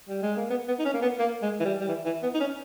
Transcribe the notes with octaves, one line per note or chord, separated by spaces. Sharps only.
G3
G#3
A#3
B3
B3
D#4
C#4
A#3
B3
A#3
G#3
E3
G3
G3
E3
E3
B3
D#4
C#4